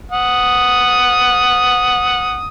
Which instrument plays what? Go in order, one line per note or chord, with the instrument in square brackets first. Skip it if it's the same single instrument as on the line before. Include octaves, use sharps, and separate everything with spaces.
[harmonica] F#5 D#6